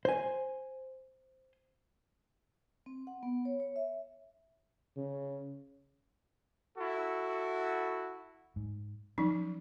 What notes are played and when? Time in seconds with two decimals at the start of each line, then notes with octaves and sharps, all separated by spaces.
0.05 C5 G#5
2.86 C4
3.07 F#5
3.23 B3
3.45 C#5
3.60 C#5
3.76 E5
4.96 C#3
6.78 E4 F#4 A4
8.56 G#2
9.18 F3 F#3 C#4 D#4